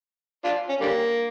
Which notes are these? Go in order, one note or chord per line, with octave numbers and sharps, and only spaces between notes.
D4 F4
C#4
D3 G3 A#3